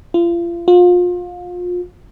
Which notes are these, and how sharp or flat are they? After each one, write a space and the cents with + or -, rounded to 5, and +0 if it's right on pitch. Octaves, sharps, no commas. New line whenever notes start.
F4 -35
F4 +30